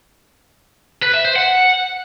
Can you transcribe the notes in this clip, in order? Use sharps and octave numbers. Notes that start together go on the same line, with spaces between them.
B4
E5
C5
F#5